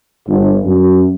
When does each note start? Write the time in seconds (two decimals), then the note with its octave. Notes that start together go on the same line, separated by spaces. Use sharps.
0.27 G1
0.65 F#2